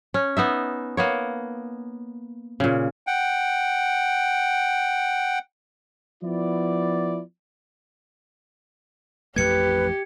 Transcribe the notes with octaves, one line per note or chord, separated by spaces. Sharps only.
C#4
B3 D#4 E5
A#3 B3 C#5
A#2 C#3
F#5 G5
F3 B3 E4 D5
A1 F2 A3 G4 B4 G#6 C#7